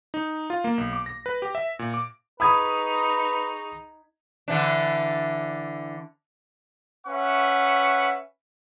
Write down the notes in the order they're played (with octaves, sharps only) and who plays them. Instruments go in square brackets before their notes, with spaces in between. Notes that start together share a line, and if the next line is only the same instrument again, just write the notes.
[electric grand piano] D#4
F4
A#3
B1
D6
A#6
B4
G4
E5
A#2
D6
[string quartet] D#4 [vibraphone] G#4 C#6 [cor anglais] B4 [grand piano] B5 D#6 G#6
[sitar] D3 E3 D4
[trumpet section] C#4 B4 E5 F#5 C#6